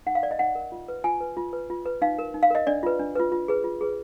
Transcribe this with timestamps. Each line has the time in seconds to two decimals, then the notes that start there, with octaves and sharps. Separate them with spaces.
0.06 D#4 F#5
0.15 F5
0.23 A#4 D5
0.31 D#5
0.39 D#4 F#5
0.55 A#4
0.72 F4
0.88 B4
1.04 F4 G#5
1.20 B4
1.37 F4
1.53 B4
1.70 F4
1.85 B4
2.02 D#4 F5
2.19 A#4
2.34 D#4
2.43 F5
2.50 A#4 D#5
2.67 D4 D5
2.83 F4 B4
2.99 D4
3.15 F4 B4
3.32 F4
3.48 G#4 B4
3.64 F4
3.81 G#4 B4